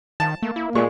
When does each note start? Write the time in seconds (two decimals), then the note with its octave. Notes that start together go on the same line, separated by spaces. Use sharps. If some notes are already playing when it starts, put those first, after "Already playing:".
0.20 D#3 A5
0.42 A3 A#3
0.56 E4
0.75 A#2 G#3 A3 C#6